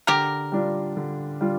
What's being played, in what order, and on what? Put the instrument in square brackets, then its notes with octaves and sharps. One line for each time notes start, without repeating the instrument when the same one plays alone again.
[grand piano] D3 [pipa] G4 A#4
[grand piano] G3 D4 F4
D3
G3 D4 F4